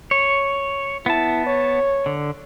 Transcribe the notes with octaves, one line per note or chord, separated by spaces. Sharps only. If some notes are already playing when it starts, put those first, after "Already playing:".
C#5
B3 E4 A5
C#5
D3